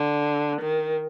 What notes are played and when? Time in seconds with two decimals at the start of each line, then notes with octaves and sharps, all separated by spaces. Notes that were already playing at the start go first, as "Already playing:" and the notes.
Already playing: D3
0.61 D#3